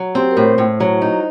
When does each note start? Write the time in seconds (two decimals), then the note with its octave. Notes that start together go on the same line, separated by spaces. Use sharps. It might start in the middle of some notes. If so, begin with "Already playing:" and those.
Already playing: F#3
0.15 C4 G4
0.31 A#4
0.37 A2 C5
0.58 A2
0.80 F#3
1.02 D#4